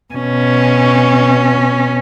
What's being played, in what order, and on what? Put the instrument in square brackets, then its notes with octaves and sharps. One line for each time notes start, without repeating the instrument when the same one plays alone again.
[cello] B2 C#4